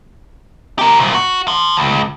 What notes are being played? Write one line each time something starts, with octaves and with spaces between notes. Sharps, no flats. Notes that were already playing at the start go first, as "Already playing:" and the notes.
G4 A#4
C2 A#2
F#4
A5 C6
C#2